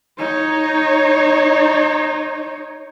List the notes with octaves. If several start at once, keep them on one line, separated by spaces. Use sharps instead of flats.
D#4 C#5